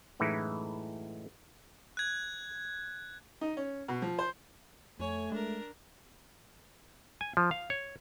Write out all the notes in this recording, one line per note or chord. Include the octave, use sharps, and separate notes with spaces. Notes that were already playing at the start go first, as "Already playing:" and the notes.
F#2 A2 E3 G#3 D#4 E4
F#6 G#6
D#4
C#4
B2
F3
C5
F2 A3 C#5 G#5
G#3 D4 A#4
G#5
F3
F5
C#5